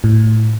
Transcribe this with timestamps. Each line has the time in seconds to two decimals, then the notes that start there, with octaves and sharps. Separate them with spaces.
0.04 A2